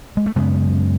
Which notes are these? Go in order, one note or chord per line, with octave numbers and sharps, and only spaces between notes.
G#3
A3
F#2 C#3 G#3 B3